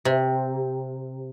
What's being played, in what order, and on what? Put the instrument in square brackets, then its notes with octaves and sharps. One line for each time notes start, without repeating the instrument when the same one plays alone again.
[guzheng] C3